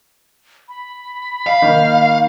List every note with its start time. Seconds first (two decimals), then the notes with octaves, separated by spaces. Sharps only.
0.69 B5
1.46 F5
1.62 D#3 A#3